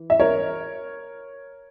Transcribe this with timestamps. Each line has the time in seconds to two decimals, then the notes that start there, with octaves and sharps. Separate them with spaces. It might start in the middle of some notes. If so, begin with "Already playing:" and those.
Already playing: E3
0.10 E5
0.20 A#4 C#5